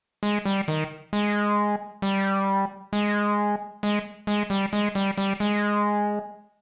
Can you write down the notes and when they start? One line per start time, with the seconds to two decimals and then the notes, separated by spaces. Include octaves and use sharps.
0.23 G#3
0.45 G3
0.68 D#3
1.13 G#3
2.02 G3
2.93 G#3
3.83 G#3
4.27 G#3
4.50 G3
4.73 G#3
4.95 G3
5.18 G3
5.40 G#3